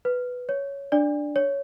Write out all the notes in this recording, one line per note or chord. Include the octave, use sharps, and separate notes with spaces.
B4
C#5
D4 D5
C#5